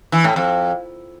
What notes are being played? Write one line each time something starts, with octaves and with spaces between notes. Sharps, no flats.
E3
A2
F2